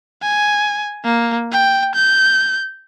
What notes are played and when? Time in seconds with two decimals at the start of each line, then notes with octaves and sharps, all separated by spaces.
0.23 G#5
1.05 A#3
1.52 G5
1.95 G6